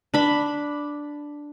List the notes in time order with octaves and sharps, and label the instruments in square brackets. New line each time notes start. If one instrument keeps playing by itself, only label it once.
[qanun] D4 B5